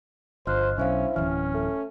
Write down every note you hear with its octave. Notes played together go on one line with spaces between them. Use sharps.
G1 F3 C5 D#5 F6 F#6
B1 C#4 D4 E4 C5 F5
D1 G1 E3 C#4 F6
A3